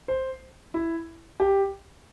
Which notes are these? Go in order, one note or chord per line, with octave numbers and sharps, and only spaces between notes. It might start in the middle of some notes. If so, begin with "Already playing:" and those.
C5
E4
G4